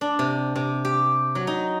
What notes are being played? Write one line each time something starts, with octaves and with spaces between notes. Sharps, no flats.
D4
C3
C3
G4
F#3
D#4